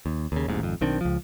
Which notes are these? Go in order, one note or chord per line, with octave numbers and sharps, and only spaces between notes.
D#2
D#2 C#3
D#1 A1 D#2 G#2
G#1 F2
B1 D#3 C4 D4
C#2 F3